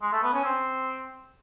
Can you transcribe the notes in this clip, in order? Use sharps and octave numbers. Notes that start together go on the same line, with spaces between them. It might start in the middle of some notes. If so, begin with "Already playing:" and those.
G#3
A3
B3
C#4
C4